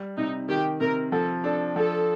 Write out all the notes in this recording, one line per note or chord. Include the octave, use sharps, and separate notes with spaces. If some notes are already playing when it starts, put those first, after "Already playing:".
Already playing: G3
C3 D#4
D#3 G4
C3 A#4
F3 A4
D4 A4
F3 A4